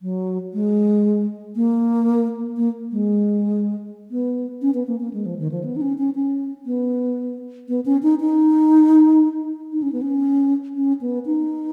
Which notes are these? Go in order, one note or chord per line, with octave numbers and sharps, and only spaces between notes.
F#3
G#3
A#3
A#3
G#3
B3
C#4
B3
A#3
A#3
G#3
F3
D#3
F3
B3
D#4
C#4
C#4
C#4
B3
B3
C#4
D#4
D#4
D#4
C#4
B3
C#4
C#4
B3
D#4